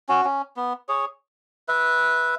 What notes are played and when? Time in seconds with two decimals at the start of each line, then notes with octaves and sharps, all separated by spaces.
0.09 C#4 F#4
0.25 C#4
0.56 B3
0.88 G#4 C#5
1.68 B4 E5